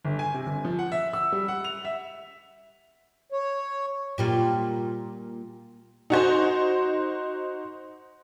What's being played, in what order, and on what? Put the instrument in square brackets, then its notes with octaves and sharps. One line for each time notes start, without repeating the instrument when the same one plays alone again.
[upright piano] G1
G#5
C3
G1
F3
F#5
E5
E6
G3
F#5
F7
E5
[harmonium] C#5
[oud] A#2 G3 F4
[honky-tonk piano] D#4 F#4 C5